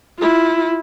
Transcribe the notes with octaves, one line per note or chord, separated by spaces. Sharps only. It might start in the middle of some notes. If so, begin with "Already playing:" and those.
E4 F4